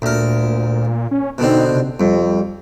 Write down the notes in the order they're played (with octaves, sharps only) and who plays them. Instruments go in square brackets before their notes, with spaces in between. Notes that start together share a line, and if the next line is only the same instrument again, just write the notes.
[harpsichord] D2 A#4 [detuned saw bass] A#2
[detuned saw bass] C#4
[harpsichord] B2 D3 C4 [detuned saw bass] D#4
[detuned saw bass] C3
[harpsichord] F2 [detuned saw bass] G3